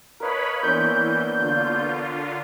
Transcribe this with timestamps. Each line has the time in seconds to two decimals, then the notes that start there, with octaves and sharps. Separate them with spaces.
0.20 A#4 B4 C#5 D#5 F5 A5 B5
0.63 E3 A#3 B3 D4 A#4 C5 C#5 G6
1.38 D3 F4